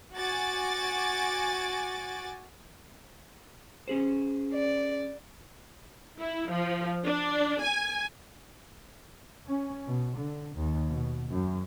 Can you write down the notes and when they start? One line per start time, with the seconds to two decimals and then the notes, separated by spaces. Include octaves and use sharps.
0.16 F#4 G#5 D6 A6
3.88 C#4 G#4 C5
4.54 D5
6.19 E4
6.52 F3
7.05 D4
7.61 G#5
9.48 C#4
9.87 B2
10.19 D3
10.56 D#2
10.90 B2
11.28 F#2